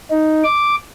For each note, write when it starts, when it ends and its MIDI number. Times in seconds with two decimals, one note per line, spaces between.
0.11 0.44 63
0.44 0.76 86